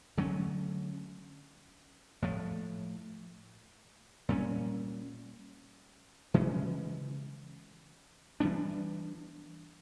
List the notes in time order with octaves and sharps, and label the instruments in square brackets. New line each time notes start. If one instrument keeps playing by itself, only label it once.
[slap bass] D3 F#3 A3 C#4
A2 F3 A3
A#2 G3 A#3 C#4
C#3 E3 G#3 C#4
E3 G3 B3 D4